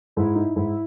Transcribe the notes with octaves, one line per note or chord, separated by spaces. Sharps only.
G#2 E4
D#4
G#2 E4